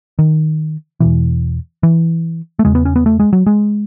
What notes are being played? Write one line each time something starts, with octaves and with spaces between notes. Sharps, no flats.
D#3
E2 B2 E3
E3
A3
E2 C#3 G#3
B3
C#4
B3
A3
G#3
F#3
G#3